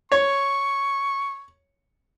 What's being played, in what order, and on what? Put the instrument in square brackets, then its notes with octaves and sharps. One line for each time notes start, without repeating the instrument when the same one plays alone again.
[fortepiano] C#5 [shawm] C#6